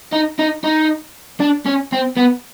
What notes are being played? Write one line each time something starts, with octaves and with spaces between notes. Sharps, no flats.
D#4
D#4
D#4
D4
C#4
C4
B3